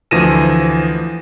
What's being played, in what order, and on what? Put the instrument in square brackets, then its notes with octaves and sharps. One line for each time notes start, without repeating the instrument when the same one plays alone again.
[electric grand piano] D2 E3 F3 A#6 D#7 E7